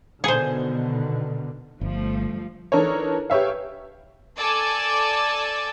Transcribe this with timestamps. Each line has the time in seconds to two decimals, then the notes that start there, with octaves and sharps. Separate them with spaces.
0.24 B2 D3 D#3 G#4 C5
1.81 G1 F3 G3 A3
2.72 E3 D4 D#4 A4 A#4 C#5
3.30 G4 B4 C#5 E5 F5
4.38 A4 D5 G#5 A5 D6 E6